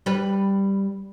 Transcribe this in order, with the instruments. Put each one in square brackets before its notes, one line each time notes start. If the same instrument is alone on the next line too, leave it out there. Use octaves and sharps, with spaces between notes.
[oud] G3 B4